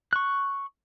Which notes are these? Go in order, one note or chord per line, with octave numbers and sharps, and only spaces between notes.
C#6 F#6